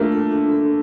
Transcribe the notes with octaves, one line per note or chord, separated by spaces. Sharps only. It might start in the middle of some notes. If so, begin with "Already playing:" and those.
Already playing: A3 A#3 D4 F4
A4
D4
A4